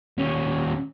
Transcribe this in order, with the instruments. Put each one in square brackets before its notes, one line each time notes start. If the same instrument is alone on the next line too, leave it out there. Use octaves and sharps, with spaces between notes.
[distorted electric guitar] D#2 C#4